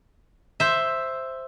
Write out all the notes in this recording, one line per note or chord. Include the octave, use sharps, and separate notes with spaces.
C5 E5